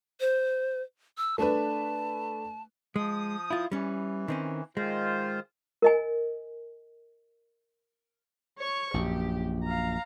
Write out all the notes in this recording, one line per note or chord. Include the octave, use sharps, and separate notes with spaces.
C5
E6
A3 D4 B4 A5
F3 G#3 D#6
E4 F4
E3 G3 C#4
D#3 C4 C#4
D#3 G#3 F4 C5
A#4 D#5 G#5
C#5 C#6
A#1 F#2 G4
F5 A#5